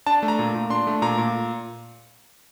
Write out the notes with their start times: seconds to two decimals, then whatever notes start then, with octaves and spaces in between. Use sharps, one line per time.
0.07 D4 A5
0.23 A3
0.28 A#5
0.39 A#2
0.55 A#2
0.70 D4 C6
0.87 A3
1.02 A#2 A#5
1.18 A#2